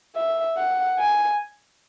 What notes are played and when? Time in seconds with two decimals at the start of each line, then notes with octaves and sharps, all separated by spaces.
0.16 E5
0.58 F#5
0.99 G#5